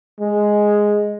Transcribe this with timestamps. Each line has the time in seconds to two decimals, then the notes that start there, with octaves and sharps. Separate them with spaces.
0.21 G#3